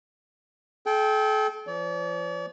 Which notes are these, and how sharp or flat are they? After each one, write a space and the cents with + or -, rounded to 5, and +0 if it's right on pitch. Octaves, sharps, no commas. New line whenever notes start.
A4 -40 G5 +0
F3 -30 D5 -45